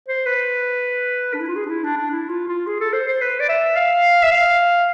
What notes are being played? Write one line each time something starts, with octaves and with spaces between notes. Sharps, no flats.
C5
B4
D4
E4
F4
G#4
D4
E4
D4
D4
E4
F4
F4
G#4
A4
C5
C5
B4
D5
E5
F5
E5
F5